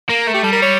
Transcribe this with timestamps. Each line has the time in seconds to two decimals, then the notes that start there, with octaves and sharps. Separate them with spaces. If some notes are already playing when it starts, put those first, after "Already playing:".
0.09 A#3 A#4
0.27 A3
0.34 G4
0.43 G3 A4
0.53 A#4
0.62 C#5